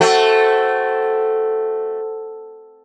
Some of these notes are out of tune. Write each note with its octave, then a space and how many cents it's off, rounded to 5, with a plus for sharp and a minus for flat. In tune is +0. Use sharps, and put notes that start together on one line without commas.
A3 +0 C4 +0 F#4 +15